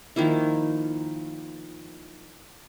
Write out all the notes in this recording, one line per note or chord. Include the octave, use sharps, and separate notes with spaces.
D#3 F3 A#3 E4